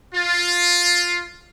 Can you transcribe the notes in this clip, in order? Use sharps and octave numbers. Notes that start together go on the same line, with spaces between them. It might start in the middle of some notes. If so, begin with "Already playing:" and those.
F4